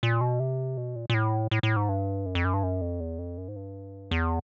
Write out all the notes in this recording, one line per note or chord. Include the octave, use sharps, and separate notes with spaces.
A#2
B2
C3
B2
A#2
A#2
A2
A2
A2
G#2
G2
F#2
F2
F#2
G2
F#2
F2
E2
F2
F#2
G#2
G2
E2